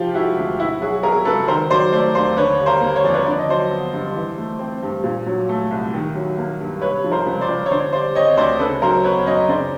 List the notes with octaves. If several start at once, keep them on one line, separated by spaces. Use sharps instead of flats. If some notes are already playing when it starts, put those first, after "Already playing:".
Already playing: C3 F3 F4 G4
G#3 E4 F#4
D2
B2 E4 F#4
F#3 F#4 G#4
B3 G#4 A#4
C#2 A4 B4
D#3 A#4 C5
F#3 C5 D5
A3 C5 D5
D#2 C5 D5
D3 B4 C#5
G3
A#4 C5
A#3
C#5
F2 D5
B4 C#5
D3 D5
D#5
F#3 C5 D5
B3
G2
E3
A3
C4
G2
A#2
F#3
A3
C2
D#3
F#3
A#3
G2
C3 B4 C#5
F3
A#4 C5
C#2
C5 D5
C#2
C#5
D3 C5 D5
G3 C5 D5
C4 C#5 D#5
D2 C5 D5
C#3 A4 B4
F#3 A#4 C5
B3 B4 C#5
F#2 C#5 D#5
C#3 C5 D5